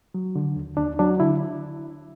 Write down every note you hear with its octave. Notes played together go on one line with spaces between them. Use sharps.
F#3
D3
D#2
D#2 D4
F#3 D4
D3 E4